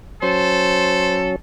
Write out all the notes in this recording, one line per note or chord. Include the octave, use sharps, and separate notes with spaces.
F#3 C#4 A4 C5